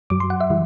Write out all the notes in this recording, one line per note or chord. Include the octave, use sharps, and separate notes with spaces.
F#2 F#3 D6
C6
F#5
E5
E3 G3